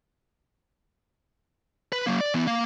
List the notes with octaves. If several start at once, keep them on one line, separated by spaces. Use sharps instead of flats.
B4
F#3 A#3
D5
E3 B3
A#3 F5